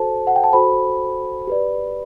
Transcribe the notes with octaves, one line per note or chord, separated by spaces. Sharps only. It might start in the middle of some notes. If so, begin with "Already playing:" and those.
Already playing: F#4 A4 C5 A5
F#5
G5
A5
F#4 A4 C5 B5
G4 B4 D5